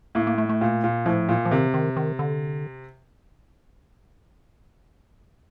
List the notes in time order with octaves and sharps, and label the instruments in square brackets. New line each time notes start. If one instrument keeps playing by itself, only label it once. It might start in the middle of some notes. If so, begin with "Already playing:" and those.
[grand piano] A2 [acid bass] A#3
[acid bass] A#3
A3
A3
[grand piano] A#2
A#2
[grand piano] A2 [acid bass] F3
[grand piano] A#2
[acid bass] F3
[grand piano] C3 [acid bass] D#3
[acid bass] D#3
D#3
D3